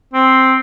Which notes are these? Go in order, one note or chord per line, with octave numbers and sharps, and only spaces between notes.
C4